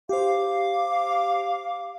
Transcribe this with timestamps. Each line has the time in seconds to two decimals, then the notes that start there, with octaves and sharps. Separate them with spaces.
0.09 G4 C5 F5 D6